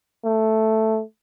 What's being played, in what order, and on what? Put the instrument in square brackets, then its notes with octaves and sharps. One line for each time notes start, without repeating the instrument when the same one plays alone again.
[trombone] A3